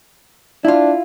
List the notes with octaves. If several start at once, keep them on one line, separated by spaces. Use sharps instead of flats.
D4 E4 F4